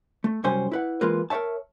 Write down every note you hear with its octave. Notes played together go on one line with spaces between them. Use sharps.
A3
C2 F#2 G3 C#4 C5 G#5
E4 B4 F#5
E3 G#3 A#3 F4 A#4 B4
A#4 B4 C#5 E5 A5